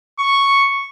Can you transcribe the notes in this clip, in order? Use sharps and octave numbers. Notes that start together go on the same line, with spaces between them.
C#6